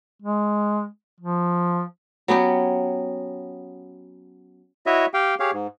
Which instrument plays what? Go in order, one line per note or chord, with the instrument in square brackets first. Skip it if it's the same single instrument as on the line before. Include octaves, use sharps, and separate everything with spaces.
[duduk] G#3
F3
[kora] F#3 B3 C#4 G4
[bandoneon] E4 F#4 C#5 D#5 E5
G4 F5 G5
G4 G#4 C#5 F5
G#2